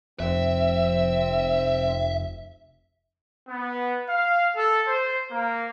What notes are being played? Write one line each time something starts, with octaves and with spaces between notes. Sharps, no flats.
F1 C4 E5
B3
F5
A4
C5
A#3